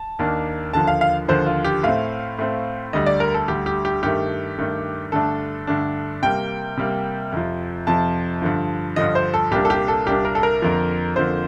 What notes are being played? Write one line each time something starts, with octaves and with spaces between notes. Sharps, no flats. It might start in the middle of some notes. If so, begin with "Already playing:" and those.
Already playing: A5
D#2 D#3 A#3 D4
D#2 D3 F3 A5
F5
F5
D#2 D3 F3 C5
F4
G4
A2 A3 C4 F5
A2 A3 C4
D2 D3 G3 D#5
D5
A#4
A4
D2 D3 G3 G4
G4
G4
G2 D#3 A3 G4
G2 D#3 A3
G2 D3 A3 D4 A4
G2 D3 A3 D4
C3 G3 A#3 G5
C3 G3 A#3
F2 C3 F3
F2 C3 F3 A5
G2 D3 F3
G2 D3 F3 D#5
C5
A4
C2 A#2 G3 A#3 D4 G4
A4
G4
A4
C2 A#2 G3 A#3 D4 G4
A#4
A4
A#4
F2 D3 F3 A#3
F2 D3 F3 A#3 C5